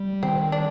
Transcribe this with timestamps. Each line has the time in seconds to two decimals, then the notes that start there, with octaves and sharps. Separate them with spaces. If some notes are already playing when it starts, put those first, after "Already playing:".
Already playing: G3
0.23 D#3 C4
0.52 D4